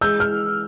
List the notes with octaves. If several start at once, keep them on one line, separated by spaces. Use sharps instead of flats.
G#3 E6 G6
F6